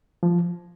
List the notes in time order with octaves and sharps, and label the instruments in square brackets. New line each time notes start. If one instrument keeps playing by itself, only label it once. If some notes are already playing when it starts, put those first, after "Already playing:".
[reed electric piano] F3